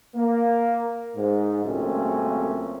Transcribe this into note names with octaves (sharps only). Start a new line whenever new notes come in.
A#3
G#2
C#2 F#2 A#2 A3 C4 C#4